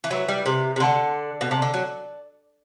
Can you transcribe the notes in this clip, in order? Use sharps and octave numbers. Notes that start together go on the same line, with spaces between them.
E3
F#3 E4 B4 E5
G3
C3
C3
D3 D5 F#5 A5 C6
B2
C3 D5 A5 D6
D3
F#3